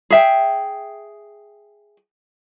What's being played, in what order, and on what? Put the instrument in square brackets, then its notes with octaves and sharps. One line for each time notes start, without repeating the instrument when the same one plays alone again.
[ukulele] G#4 E5 G5